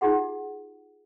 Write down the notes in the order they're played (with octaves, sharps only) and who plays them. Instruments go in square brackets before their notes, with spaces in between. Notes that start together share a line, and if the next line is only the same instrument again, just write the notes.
[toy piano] D#4 F4 G4 G#4 F#5